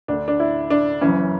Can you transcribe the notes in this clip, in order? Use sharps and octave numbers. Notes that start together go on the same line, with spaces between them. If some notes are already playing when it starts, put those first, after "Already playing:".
D2 D3 D4
D4
E4
D4
F#1 F#2 E3 C#4